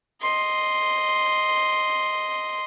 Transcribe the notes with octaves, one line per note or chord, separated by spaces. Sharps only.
D#5 C6